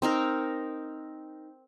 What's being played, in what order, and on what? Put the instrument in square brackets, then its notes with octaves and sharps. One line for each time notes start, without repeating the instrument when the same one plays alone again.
[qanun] C4 D#4 A#4